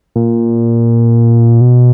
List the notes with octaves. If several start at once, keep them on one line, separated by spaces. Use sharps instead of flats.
A#2
B2